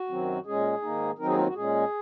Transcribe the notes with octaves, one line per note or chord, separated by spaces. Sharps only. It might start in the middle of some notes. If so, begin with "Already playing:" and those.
Already playing: F#4
F#2 D#3 F#3 C4
A#2 G#3 C#4 G#4
G#2 D#3 A#3 D#4
D#2 D#3 F#3 C4 D#4 A#4
G#4
F4
F#4
A#2 G#3 C#4 G#4